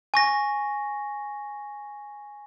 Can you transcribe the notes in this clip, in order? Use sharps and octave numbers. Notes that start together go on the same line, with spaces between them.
G#5 C#6 A#6